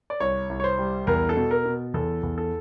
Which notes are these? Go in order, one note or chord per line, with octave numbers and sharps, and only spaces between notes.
D5
C2 C#5
C2
C#5
C5
G3
E2 A#4
A4
B2
A#4
B2
E2 A4
E2
A4